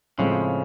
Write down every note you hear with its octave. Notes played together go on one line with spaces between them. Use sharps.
A2 C#3 F3 G#3 C4